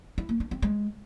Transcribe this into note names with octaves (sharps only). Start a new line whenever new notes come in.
E4
A#3
D4
C4
G#3